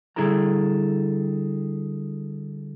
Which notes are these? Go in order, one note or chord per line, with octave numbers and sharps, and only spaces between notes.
D3 G3 E4 G#4 A4 A#5